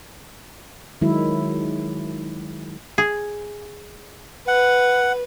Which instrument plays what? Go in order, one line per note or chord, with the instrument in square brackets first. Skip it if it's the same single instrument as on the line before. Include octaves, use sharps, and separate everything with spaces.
[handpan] D#3 F#3 G#3 E4
[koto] G#4
[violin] B4 [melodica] F#5